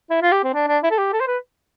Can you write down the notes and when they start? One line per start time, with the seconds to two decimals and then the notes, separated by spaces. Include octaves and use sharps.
0.10 E4
0.22 F4
0.32 G4
0.44 C4
0.54 D4
0.68 D4
0.84 E4
0.91 A4
0.98 G4
1.13 A4
1.21 C5
1.27 B4